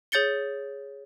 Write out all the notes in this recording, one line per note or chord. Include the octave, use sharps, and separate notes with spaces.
G#4 C#5 G6 A6 C#7 G7